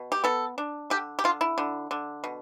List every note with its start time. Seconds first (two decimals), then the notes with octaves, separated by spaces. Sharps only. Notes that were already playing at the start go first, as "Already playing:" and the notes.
Already playing: B2
0.12 G4
0.24 B3 A4
0.58 D4
0.90 D3 G4
1.19 G4
1.24 D3 F4
1.41 E4
1.58 D3
1.91 D3
2.24 B2